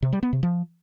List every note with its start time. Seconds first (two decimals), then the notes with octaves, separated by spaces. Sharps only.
0.02 C3
0.13 G3
0.23 B3
0.33 C3
0.43 F3